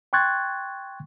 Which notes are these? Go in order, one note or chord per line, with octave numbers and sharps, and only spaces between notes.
G5 C6 C#6 F#6 G#6 A6